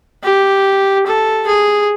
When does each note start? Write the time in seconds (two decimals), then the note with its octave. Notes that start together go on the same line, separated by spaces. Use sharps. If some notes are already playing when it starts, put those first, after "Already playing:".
0.23 G4
1.06 A4
1.47 G#4